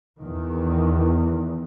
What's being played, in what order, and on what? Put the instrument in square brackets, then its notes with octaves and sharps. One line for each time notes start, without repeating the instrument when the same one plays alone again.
[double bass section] E2 D#3